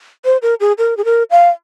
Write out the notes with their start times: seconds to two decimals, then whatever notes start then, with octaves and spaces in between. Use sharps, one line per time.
0.25 C5
0.42 A#4
0.60 G#4
0.78 A#4
0.97 G#4
1.05 A#4
1.31 F5